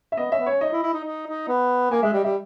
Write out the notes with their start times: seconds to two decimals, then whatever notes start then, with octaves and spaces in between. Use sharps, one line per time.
0.12 E5
0.17 B3 D#5
0.31 C#4 E5
0.39 B3
0.46 C#4 C#5
0.61 D#4 D#5
0.72 E4
0.83 E4
0.93 D#4
1.04 D#4
1.27 D#4
1.48 B3
1.91 A#3 G#5
2.02 G#3 E5
2.13 G3 D#5
2.24 G3 E5